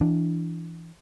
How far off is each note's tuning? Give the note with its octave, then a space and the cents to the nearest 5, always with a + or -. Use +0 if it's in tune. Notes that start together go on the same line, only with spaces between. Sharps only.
E3 +15 D4 +0